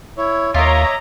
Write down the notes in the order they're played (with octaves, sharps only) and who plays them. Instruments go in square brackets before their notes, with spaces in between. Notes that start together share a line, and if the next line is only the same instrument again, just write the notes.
[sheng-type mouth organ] E4 C#5
[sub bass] D#2 [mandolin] F4 A#4 [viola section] C#5 D#5 A#5 [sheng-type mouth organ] E5 D6